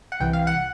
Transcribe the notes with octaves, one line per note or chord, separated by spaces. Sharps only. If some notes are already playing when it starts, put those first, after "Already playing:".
F#5
C2 C3 E3 G5
F5
F#5